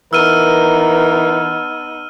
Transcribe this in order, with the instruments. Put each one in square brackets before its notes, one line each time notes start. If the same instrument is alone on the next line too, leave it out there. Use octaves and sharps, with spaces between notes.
[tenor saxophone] E3 [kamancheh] B3 D#4 [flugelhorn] A#4 [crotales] E6 F6 D#7